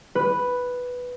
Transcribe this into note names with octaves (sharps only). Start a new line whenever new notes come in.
B4